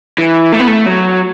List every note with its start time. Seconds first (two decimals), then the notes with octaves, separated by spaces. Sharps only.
0.18 E3
0.52 A3
0.60 B3
0.67 A3
0.86 F#3